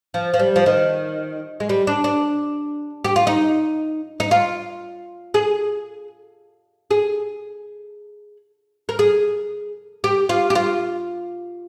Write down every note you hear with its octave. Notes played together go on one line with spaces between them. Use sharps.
F3
F3
G3
F3
D#3
G#3
G3
D4
D4
G4
F4
D#4
D#4
F4
G#4
G#4
A#4
G#4
G4
F4
G4
F4